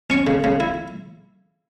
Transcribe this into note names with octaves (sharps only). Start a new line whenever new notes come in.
C#4 C#6
C#3
C#3
E4